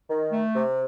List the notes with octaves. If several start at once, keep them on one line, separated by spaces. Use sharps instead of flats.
D#3
A3
C3